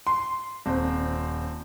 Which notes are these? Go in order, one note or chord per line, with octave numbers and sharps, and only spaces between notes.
C6
D#1 C4